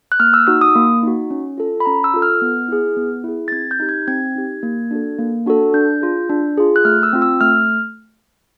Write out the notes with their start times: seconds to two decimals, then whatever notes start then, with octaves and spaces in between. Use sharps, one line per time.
0.12 F#6
0.20 A#3 F6
0.34 E6
0.47 D#4 F#4 E6
0.61 D#6
0.75 A#3
1.03 D#4 F#4
1.30 C#4
1.58 F4 A4
1.80 B5
1.86 C#4 A#5
2.04 E6
2.14 F4 A4
2.22 F6
2.42 B3
2.68 E4 G#4
2.97 B3
3.24 E4 G#4
3.48 A6
3.52 C4 G#6
3.71 G6
3.80 D#4 G4
3.89 G#6
4.07 C4 G#6
4.35 D#4 G4
4.63 A#3
4.91 D4 F#4 A4
5.19 A#3
5.46 D4 F#4 A4
5.74 D4 G6
6.01 F4 G#4
6.29 D4
6.57 F4 G#4
6.76 F#6
6.85 A3 F6
7.03 E6
7.13 C4 F4
7.22 E6
7.40 A3 F6